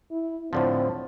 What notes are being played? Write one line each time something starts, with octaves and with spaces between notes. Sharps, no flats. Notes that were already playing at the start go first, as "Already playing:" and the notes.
E4
A2 D3 F3 C4